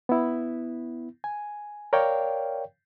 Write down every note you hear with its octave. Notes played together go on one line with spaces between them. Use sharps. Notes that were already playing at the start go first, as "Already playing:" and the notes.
B3 E4
G#5
A#4 C#5 D5 F5 G5